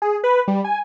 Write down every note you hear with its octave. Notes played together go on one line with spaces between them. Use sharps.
G#4
B4
G3
G#5